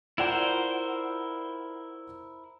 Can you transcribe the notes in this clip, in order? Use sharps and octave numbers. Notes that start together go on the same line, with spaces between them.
E4 F4 A#4 C5 D5 F#5